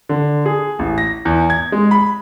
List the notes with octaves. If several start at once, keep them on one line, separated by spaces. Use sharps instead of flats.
D3
G#4
A1
A#6
E2
G#6
G#3
B5